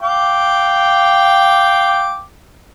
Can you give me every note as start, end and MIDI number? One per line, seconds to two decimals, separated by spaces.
0.01 2.21 77
0.01 2.21 79
0.01 2.21 86